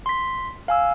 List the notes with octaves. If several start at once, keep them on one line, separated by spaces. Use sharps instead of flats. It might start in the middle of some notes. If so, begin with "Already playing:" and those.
C6 B6
F5 G#5 E6